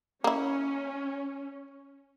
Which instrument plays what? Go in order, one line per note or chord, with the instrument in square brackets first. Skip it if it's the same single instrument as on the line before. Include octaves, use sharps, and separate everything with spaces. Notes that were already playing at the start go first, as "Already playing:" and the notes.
[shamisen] A#3 E4 [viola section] C#4